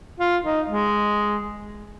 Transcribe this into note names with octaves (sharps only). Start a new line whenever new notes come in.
F4
D#4
G#3